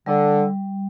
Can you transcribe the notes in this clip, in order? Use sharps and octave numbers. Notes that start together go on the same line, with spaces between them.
D3 G3